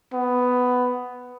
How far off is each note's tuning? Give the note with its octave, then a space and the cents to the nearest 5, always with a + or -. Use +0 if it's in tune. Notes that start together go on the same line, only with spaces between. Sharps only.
B3 +10